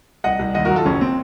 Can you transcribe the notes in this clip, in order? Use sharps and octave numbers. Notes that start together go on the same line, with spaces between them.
C2 D#5 F#5
C2
D#2 D#5 F#5
F#4 A#4
F#3
F4 A4
F#1 C#4
C4